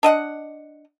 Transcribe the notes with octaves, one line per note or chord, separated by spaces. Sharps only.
D4 D#5 F#5